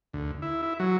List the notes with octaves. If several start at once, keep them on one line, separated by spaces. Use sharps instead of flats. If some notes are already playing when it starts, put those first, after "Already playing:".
D2
E4
E4
F#3